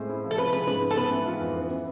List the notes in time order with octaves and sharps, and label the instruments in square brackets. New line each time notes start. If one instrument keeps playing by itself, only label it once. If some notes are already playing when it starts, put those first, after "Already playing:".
Already playing: [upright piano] A2 G#3 C4 [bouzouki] C5
[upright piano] E4
F3
[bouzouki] A4
[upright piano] C4 [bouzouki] B4
[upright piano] G#3 [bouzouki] B4
[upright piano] G#2 [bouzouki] B4
[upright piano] G#2
[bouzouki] A4
[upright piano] B3 [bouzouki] B4
[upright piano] E3
F4
F2
B3
E3